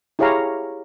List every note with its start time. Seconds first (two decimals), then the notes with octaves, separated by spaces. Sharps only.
0.19 E4 G4 G#4 C#5 F5 A#5